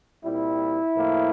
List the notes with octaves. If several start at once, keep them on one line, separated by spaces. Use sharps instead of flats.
A#2 G3 C4 E4
A2 F3 A#3